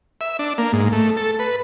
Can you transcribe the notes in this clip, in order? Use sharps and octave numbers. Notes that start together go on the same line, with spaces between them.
E5
D4
A#3
G#2
A3
A4
B4